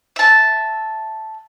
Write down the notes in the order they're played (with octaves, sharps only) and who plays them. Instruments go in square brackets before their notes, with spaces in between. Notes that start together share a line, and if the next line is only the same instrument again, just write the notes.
[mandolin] E5 A5